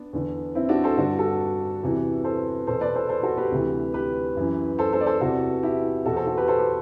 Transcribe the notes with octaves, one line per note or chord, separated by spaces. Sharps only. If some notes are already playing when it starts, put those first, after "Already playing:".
Already playing: B3 D4
E2 D3
C4 E4
D4 F#4
A4 C5
G2 D3 D4 F#4
F#4 A4
E2 C3 E3
A4 C5
E2 B2 A4 C5
B4 D5
A4 C5
A4 C5
F#4 A4
G4 B4
D2 C3 E3
G4 B4
F#2 E3
A4 C5
A4 C5
D5
A4 C5
E2 C3 E3 F#4 A4
E4 G4
E2 B2 F#4 A4
A4 C5
F#4 A4
G4 B4
A4 C5
G4 B4